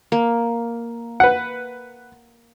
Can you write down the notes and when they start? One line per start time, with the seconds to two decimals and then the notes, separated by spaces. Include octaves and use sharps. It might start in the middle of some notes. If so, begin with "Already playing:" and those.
0.12 A#3
1.20 B4 F#5